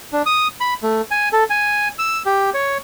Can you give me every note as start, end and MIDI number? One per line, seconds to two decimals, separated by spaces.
0.13 0.22 62
0.26 0.48 87
0.60 0.74 83
0.83 1.02 57
1.11 1.29 80
1.33 1.44 69
1.50 1.88 80
1.99 2.22 88
2.26 2.50 67
2.54 2.78 73